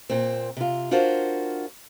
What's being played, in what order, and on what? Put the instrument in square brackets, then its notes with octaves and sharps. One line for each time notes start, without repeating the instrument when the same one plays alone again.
[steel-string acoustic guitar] A#2 C4
C3 F4
D4 F4 F#4 A#4 C5